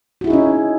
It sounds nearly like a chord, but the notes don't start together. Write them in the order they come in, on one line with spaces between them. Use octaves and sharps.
F#4 E4 G#4 D#4 C#4